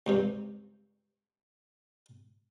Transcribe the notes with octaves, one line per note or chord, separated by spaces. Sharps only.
C#2 G2 C3